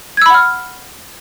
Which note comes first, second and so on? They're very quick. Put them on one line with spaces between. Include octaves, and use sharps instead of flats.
G#6 E6 B5 F#5 F6